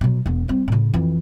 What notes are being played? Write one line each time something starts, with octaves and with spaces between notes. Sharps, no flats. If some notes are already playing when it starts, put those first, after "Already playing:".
B2 F#3
E1 B3
G3 C4
A2 C#3
F2 E3